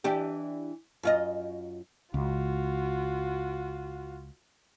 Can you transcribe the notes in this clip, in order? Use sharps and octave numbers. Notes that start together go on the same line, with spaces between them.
E3 D4 G4
F#2 F4 D#5
C#2 F4 F#4